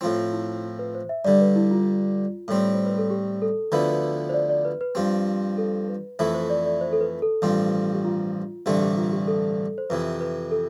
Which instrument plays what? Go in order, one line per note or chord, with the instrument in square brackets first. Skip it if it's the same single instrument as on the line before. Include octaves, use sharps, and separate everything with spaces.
[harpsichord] A2 F3 C4 [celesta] F4
[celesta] E4
F4
B4
C5
E5
[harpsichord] G2 D3 G3 [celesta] D5
[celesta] B4
E4
F4
[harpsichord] A2 G3 C4
[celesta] C5
B4
A4
G4
A4
[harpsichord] D2 D3 F3 B3 E4 [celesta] B4
[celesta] B4
C5
D5
D5
B4
B4
[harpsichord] G2 F3 C4 [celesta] G4
[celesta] A4
B4
[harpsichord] F2 E3 A3 E4 [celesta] C5
[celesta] C5
D5
D5
C5
A4
B4
A4
[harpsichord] A1 G2 F3 C4
[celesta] G4
F4
[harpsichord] A1 G2 D3 A3 C4 [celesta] G4
[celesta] G4
F4
G4
A4
C5
[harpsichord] F2 C3 E3 [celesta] B4
[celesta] B4
A4